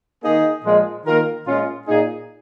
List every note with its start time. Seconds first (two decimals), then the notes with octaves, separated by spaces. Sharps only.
0.23 D#3 A#3 D#4 G#4
0.65 A#2 F3 G#3
1.06 D#3 A#3 F4 A#4
1.47 A#2 G#3 C#4 F4
1.88 A#2 A#3 D#4 G#4